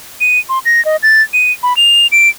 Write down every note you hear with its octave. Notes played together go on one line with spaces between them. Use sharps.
D#7
C6
A#6
D#5
A6
D#7
B5
F7
D7